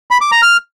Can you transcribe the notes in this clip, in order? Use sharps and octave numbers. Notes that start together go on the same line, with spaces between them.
B5
D6
A#5
F6